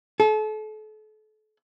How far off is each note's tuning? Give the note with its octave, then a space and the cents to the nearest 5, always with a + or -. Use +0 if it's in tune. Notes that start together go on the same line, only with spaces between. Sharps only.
A4 -35